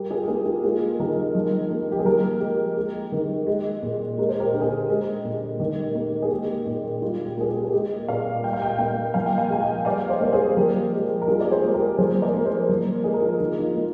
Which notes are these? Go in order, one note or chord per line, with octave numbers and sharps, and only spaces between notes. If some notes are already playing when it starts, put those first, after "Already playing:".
Already playing: G3 G4 A#4
F4 G#4
G4
A#3 F4 G#4
F4 G#4
G#3 F4 G#4
D#3 G4 A#4
F3
A#3
G4
G#4
F3 G4 A#4
G#3 G4
G#3
D#3
G#3
A#2
G#3 A#4
C5
G4 A#4
D3 G4
G#4
G4
G#3
A#2
D#3
A#3
G#4
G#3 G4
A#2
G3 F4
G4
A#3 G#4
G4
G#4
G#3 G4
A#2 D5 F5
G3 G5
F5
D#5 G5
A#3 D#5 G5
F3 F5 G#5
G5
F5 G#5
G#3 G#5
D#5 G5
G3 D5 F5
C5 D#5
A#3 D5
G#4 C5
F3 G4 A#4
G#3
A#4
G3 F4 G#4
D5
G#4 C5
A#3 C5
G4 A#4
F3 G#4 C5
A#4 D5
A#3
G#4 C5
F3
G#3 G#4
A#4
F4 G#4
D#3 F4
F4
A#3